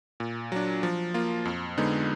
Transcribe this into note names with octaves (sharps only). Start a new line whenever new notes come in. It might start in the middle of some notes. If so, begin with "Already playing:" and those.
A#2
F#3 D4
F3
A#3 F4
F2
D3 G#3 B3 D#4